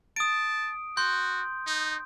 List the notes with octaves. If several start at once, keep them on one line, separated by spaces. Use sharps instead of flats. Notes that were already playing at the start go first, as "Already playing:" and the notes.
A5 D#6 D7
F#4 C6 G6
D#4